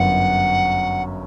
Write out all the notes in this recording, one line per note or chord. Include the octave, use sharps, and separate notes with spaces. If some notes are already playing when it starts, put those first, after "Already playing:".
Already playing: G1 F#2 F#5